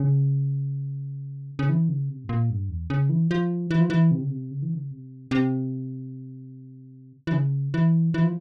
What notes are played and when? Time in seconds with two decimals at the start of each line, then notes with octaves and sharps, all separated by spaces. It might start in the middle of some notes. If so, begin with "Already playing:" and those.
Already playing: C#3
1.59 C#3
1.69 E3
1.89 C#3
2.09 C3
2.24 G#2
2.29 A#2
2.50 G2
2.69 E2
2.90 C#3
3.09 E3
3.31 F3
3.71 E3
3.81 F3
3.90 E3
4.11 C3
4.21 C#3
4.30 C3
4.51 C#3
4.63 E3
4.74 C#3
4.91 C3
5.31 C3
7.27 E3
7.33 C#3
7.74 E3
8.14 E3
8.23 F3